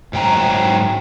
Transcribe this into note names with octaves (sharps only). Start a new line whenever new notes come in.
G#2 F#3 G5 A#5